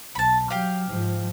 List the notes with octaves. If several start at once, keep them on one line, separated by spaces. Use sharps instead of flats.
B1 A5 B5
F#3 G4 F5
G#2 F3